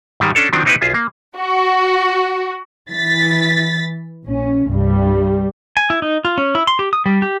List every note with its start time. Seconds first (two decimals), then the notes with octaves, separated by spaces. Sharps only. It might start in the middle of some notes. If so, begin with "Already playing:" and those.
0.20 G#2 D#3 G3 G#3
0.35 C#4 D4 A4 C#5
0.53 D#3 F3 F#3 C4 D4
0.65 A#3 C4 D#4 E4 G4 B4
0.81 B1 F4 G#4 E5
0.94 A#3
1.37 F#4
2.89 E3 A6 B6
4.26 A#1 C#4
4.69 C2 G2 G3
5.77 G#5
5.90 E4
6.02 D#4
6.25 F4
6.38 C#4
6.55 E4
6.67 C6
6.79 G4
6.93 D#6
7.06 G3
7.22 G4